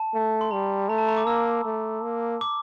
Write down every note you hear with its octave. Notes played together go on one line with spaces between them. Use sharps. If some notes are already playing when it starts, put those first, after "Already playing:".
Already playing: A5
A3
C6
G3 A#5
A3 A#5
A5
A#5
D6
A#3 E6
A3
A#3
D6